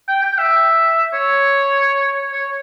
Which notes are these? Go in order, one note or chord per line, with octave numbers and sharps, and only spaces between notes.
G5
G5
E5
C#5
C#5